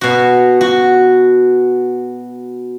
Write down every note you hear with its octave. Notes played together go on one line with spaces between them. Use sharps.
B2 F#4
F#4